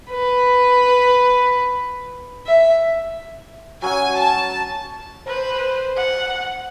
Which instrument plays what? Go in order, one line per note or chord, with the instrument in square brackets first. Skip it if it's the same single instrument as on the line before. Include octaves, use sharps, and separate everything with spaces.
[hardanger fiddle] B4
E5
[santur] F#3 C#4 F#5 [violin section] G#5
[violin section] A5
[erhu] B4 [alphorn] C5
[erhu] F#5